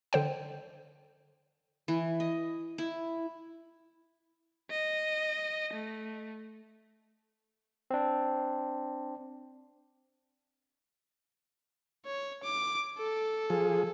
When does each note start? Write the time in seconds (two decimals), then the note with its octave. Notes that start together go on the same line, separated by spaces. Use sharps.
0.13 D3 C5 G5
1.88 E3
2.20 D#5
2.78 E4
4.70 D#5
5.74 A3
7.91 C4 D4
12.06 C#5
12.44 D6
12.99 A4
13.50 F3 G#4